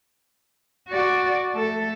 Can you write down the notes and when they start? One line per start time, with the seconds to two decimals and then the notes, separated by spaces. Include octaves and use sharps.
0.89 F#4 D5
1.54 A3 A4